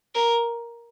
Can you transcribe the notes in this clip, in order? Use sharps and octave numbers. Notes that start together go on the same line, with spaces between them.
A#4